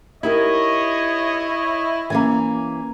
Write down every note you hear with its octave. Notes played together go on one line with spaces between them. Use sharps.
D#4 E4 G4 A#4 C#5 D#5
E3 A#3 C#4 G#5